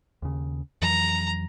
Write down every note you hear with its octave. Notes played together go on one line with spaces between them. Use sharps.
D#2 C#3
F2 E3 F#3 A#5